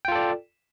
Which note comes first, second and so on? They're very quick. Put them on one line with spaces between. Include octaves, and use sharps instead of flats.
G5 F4 A4 D5